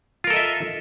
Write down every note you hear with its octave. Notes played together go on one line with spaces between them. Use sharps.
F4 A4 A#4 D#5 E5